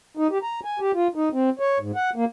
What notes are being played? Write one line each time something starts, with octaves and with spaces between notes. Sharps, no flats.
D#4
G4
A#5
G#5
G4
F4
D#4
C4
C#5
G#2
F#5
A#3